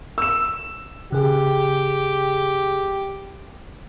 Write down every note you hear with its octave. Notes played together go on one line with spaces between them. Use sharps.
E6 E7
C#3 G4 G#4